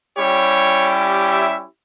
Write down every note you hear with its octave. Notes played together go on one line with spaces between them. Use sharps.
G3 C#4 E4 G4 C#5
E5